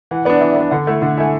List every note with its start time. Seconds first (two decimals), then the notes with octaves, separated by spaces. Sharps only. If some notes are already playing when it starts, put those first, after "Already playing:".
0.11 E3 F#5
0.25 B3 D4 D5
0.41 E3 E5
0.56 B3 D4
0.71 D3 F#5
0.87 A3 E4
1.02 D3 F#5
1.17 A3 E4 G#5